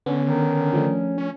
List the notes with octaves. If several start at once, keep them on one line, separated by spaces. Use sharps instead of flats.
D3 B3 C#4
D#3
F3 A3 D4
C#4